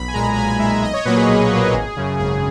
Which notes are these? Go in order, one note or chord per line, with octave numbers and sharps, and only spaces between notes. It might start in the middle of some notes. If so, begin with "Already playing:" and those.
Already playing: B1 B5
G#5
A#2 G#3 A#5
B1 G#5
A#2 G#3 E5
B1 D#5
C#5
A#2 F#3 A#3 B4
G#4
B1
A#2 F#3 A#3
G#1
F#2 C#3
G#1 G#4